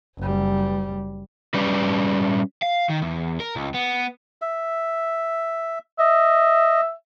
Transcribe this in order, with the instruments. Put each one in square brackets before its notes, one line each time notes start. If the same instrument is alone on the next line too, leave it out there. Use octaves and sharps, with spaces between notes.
[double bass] F#1 G3
[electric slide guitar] G3 C#4 B4 D5
[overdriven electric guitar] F5
D#3
E2
A#4
C#2
B3
[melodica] E5
[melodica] D#5 [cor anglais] E5